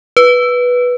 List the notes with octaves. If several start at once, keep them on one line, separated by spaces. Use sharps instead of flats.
B4